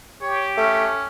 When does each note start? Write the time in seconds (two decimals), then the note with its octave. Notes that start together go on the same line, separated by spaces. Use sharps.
0.22 G4 C#5
0.57 A3 C#4